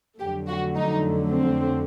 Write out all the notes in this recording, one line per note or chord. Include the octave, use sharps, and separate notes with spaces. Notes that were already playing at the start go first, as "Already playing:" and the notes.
F2 D3 F#3 A3 G4
F#4
D#4
C4